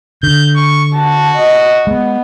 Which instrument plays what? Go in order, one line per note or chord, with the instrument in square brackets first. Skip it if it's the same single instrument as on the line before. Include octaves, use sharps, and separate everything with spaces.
[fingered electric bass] D3 [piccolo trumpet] G6
[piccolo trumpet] C#6
[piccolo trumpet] F#4 [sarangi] A5
[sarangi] D#5
[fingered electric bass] G#3 [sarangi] B3